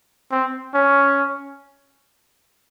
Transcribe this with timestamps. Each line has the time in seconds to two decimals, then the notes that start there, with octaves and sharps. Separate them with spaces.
0.31 C4
0.74 C#4